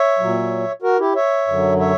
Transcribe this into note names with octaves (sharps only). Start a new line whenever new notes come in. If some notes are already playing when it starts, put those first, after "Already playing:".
Already playing: C#5 E5
A#2 F#3
F#4 A#4
E4 G4
C#5 E5
F#2 D3 F#3
C#5 E5